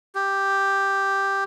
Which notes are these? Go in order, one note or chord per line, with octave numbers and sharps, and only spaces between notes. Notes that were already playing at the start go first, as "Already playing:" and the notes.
G4